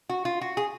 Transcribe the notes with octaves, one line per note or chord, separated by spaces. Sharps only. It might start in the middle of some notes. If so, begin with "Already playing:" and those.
F#4
F4
F#4
G#4